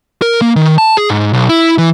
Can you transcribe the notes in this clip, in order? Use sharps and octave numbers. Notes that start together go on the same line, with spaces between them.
A#4
A#3
D#3
A5
G#4
G#2
B1
E4
E3